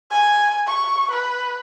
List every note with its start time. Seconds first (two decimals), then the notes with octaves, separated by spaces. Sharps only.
0.11 G#5
0.67 C#6
1.11 B4